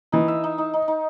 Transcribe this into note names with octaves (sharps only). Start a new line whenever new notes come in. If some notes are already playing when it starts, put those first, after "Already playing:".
E3 D#4
E5
D#4
D#4
D#4
D#4